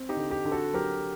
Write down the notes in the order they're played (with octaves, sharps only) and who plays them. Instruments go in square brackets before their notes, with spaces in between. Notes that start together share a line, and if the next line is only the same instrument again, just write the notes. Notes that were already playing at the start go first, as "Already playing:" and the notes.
Already playing: [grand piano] C4
[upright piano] D#4 G4
[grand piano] D3
[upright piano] D#4 G4
[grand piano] D3
[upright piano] F#4 A4
[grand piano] F#3 [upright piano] G4 A#4